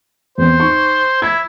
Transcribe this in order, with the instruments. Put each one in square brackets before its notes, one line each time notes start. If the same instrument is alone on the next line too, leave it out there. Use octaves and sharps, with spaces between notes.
[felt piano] E2 C4 [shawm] C5
[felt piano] D#4 C#6
[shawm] E4 [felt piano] G#6